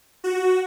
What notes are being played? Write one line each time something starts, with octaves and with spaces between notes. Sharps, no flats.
F#4